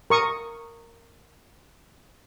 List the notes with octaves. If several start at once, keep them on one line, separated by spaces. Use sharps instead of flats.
A#4 C#6 D#6